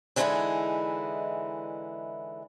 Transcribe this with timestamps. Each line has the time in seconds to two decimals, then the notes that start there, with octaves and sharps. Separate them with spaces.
0.16 D3 E3 G#3 C4 D#4 E4